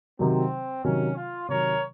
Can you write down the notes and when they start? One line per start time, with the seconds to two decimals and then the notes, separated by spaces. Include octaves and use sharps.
0.19 C3 D#3 F#3 C4
0.83 C3 D#3 F#3 C#4
1.17 F4
1.48 C3 D#3 F#3 A#4 C#5